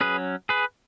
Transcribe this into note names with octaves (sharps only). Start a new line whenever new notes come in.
F#3 C#4 G#4 B4
G#4 B4